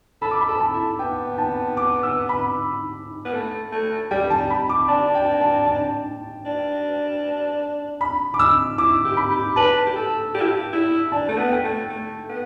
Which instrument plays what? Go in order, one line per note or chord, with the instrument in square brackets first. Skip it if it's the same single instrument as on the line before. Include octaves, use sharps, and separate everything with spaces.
[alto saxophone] A4 [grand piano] B5
[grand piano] D6
B5
[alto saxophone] A4
[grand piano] A5
[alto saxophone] E4
[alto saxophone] B3 [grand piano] G5
[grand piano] G5
A5
D6
E6
B5
[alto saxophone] B3
A3
A3
[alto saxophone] G3 [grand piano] G5
[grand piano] A5
[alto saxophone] G3
[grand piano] B5
D6
[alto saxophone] D4 [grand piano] A5
[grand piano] G5
A5
A5
[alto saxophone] D4
[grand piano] B5
D6
E6
[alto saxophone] E4 [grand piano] D6
[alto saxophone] G4
[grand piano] B5
[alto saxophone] G4
[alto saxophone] B4 [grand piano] A5
[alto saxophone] G4
A4
G4
E4
G4
E4
[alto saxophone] D4 [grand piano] A5
[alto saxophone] A3
B3
[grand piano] G5
[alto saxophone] A3
A3
B3